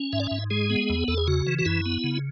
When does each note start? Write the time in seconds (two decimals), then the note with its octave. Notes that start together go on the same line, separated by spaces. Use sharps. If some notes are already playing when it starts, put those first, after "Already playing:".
Already playing: C#4
0.13 G#2 E5
0.20 D5
0.27 G#2 E5
0.50 G#3 G#4
0.70 B3
0.90 E2
1.08 E2 A4
1.18 G#4
1.27 C#3 F#4
1.47 E3
1.59 F#4
1.65 F#2 E4
1.86 B3
2.04 C#3